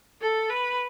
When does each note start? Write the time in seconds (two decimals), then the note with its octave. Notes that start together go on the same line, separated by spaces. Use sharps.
0.21 A4
0.50 B4